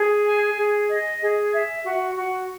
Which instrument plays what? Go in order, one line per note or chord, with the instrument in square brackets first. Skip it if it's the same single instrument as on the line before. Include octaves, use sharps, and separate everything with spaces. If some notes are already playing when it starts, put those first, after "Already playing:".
Already playing: [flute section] G#4
G#5
G#4
D#5
G#4
E5
F#4
F#4